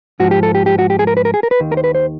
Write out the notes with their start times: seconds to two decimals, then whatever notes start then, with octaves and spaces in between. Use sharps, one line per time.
0.20 G#2 F3 F#4
0.31 G4
0.43 A4
0.55 G4
0.66 G4
0.79 F#4
0.90 G4
0.99 G#4
1.07 A#4
1.17 B4
1.25 A#4
1.34 G#4
1.43 A#4
1.51 B4
1.60 D#2 D#3
1.72 A#4
1.77 C5
1.84 B4
1.95 C5